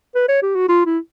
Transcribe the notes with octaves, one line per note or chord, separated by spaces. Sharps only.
B4
C#5
G4
F#4
F4
E4